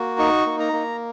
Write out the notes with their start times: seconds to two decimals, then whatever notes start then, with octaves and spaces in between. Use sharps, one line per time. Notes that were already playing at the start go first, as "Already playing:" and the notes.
Already playing: A#3 F#4
0.19 D#4 C#6
0.46 A#3
0.60 A#5
0.73 A#3